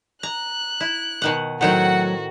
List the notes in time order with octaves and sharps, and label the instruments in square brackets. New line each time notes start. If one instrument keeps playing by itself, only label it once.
[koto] A#5 [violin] F#6
[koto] E4
B2 D#3 F#5
[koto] A2 D#3 C4 [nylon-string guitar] F#3 A3 [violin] F#4 [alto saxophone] F#5